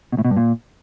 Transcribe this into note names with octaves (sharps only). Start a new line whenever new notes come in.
B2
A2
B2
G2
A#2